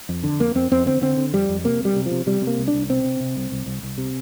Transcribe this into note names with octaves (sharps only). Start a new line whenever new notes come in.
F2
D3
F2 A#3
F2 C4
F2 C4
D3 C4
D3 C4
D3
F2 G3
F2
C3 A#3
C2 G3
C3
F3
C3
C3 G3
C3
A#3
C2
D4
C2
C3 C4
C3
C3
C2
C2
C2
C2
C3